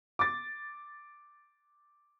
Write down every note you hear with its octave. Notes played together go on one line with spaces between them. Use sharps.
D6 A6